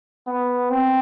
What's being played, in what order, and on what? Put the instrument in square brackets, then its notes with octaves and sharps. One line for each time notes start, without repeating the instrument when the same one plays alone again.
[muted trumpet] B3
C4